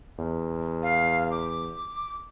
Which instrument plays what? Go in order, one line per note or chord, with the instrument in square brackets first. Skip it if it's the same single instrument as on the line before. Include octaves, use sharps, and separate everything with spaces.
[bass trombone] E2
[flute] F5
D6